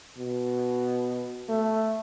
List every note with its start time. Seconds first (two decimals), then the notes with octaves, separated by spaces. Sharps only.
0.17 B2
1.49 A3